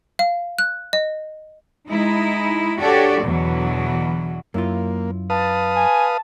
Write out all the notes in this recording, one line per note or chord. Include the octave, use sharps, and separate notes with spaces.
F5
F#6
D#5
G#3 D#4 E4
D4 F#4 G4 A4 C#5 D5
E2 B2 D3 E3 F#3
F#2 A#3 E4 F4
B4 F5 A5 D#6
G#5